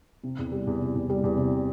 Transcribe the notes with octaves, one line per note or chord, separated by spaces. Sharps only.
C3
E2
G3
E2
C3
E2
G3
E2
C3